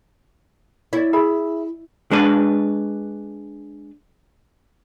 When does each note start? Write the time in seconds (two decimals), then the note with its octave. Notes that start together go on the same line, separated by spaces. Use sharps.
0.93 E4 C#5 D5
1.13 G#4 E5 B5
2.11 G#3 D4 B4